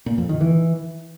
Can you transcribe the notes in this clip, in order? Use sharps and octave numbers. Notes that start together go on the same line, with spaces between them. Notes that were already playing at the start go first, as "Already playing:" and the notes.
A#2
F2
D#3
E3